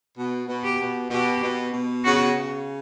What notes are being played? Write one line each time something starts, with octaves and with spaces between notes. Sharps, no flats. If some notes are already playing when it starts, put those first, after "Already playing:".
B2
B2
G4
B2
B2 G4
B2
B2
C#3 F#4
C#3